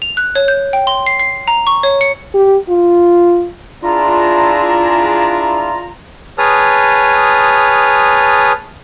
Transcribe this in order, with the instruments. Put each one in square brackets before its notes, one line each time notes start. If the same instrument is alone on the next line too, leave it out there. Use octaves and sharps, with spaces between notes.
[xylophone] F7
F#6
C#5
G6
G5
C6
C7
C7
A#5
C#6
C#5
C#7
[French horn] G4
F4
[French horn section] D4 E4 G#4 [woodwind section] F4 A#5
[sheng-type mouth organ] G#4 B4 C#5 A5 D#6 F6